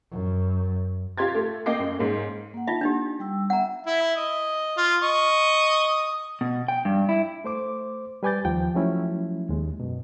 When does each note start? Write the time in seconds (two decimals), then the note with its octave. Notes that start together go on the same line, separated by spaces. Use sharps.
0.12 F#2
1.18 F4 G4 C6 G#6 A6
1.35 A3
1.66 A#3 D#5 G5 D6 C7
1.79 F#2
1.98 G#2 A#3 C#4
2.54 A#3 F#5
2.67 D#4 F4 E5
2.81 D4 D#4 G4
3.19 G3 G5 E6
3.50 B3 E5 F#5 A#5
3.87 E4 E5
4.16 D#5
4.77 F4
5.03 D#5 C#6 D#6
6.41 B2
6.68 G5
6.85 G2
7.09 E4
7.44 A3 C5 D6
8.23 G3 B4 G#5 D6 G6 A6
8.45 D#2 F3 G5
8.75 F3 F#3 A3 C#4 E4
9.50 D#2 G#3
9.80 F#2 B2